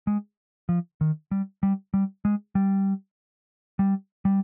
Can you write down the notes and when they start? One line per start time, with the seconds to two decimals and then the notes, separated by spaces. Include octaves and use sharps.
0.07 G#3
0.69 F3
1.01 D#3
1.31 G3
1.63 G3
1.94 G3
2.25 G#3
2.55 G3
3.79 G3
4.25 G3